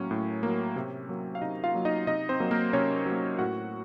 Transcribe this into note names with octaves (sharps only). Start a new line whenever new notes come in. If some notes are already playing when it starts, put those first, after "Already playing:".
Already playing: A2 F#3 A#3 C#4
A2
F#3 A#3
C3
F#3 A#3
F5
C3 D#4 D#5
F4 F5
F#3 A#3
D#4 D#5
C3 D#4 D#5
C4 C5
F#3 A#3
A#3 A#4
C3 C#4 C#5
F#3
A#3
A2 F#4 F#5